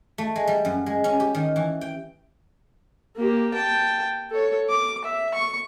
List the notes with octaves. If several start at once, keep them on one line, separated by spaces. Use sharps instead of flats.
A3
G#3
G3
F#2
G#3
C#4
G4
D#3
E3
G5
A#3 G4
G5 A5
A4 C#5
D6
E5
C#6